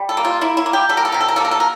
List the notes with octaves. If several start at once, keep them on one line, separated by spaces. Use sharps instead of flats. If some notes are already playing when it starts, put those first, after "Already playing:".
Already playing: G3
A4
A#3
F4
A#3 E4
E4
A#3
G4
G3 A4
A#4
A4
C3 A#4
A4
A#4
A#3 A4
A#4
A4
A#4